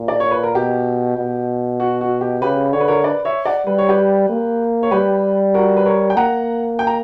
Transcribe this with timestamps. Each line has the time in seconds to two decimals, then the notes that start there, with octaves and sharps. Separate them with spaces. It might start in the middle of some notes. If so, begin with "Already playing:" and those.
Already playing: A#2
0.08 D5
0.20 C#5
0.31 B4
0.43 A#4
0.55 B2 G4
1.17 B2
1.80 F#4
2.01 F#4
2.21 G4
2.42 C#3 G4 B4
2.73 D3 C#5
2.80 B4
2.88 A#4 C#5
3.04 B4 D5
3.25 C#5 E5
3.45 D5 F#5
3.66 G3 B4
3.78 C#5
3.89 G4 B4
4.29 A#3
4.83 C#5
4.91 G3 G4 B4
5.54 F#4 A#4
5.77 B4
5.85 A#4 C#5
6.10 G5
6.16 A#3 F#5 A#5
6.79 G5
6.87 A#5